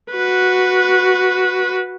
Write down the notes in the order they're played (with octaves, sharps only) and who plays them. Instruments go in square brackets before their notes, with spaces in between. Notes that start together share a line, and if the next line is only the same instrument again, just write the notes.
[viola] F#4 B4